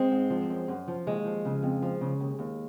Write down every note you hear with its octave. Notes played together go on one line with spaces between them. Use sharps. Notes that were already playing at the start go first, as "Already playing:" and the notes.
Already playing: G#3 C4
G#2
F3
F#2
F#2
F3
D#2 G#3
F3
C#3
F2
F3
C#3
D#2
D#2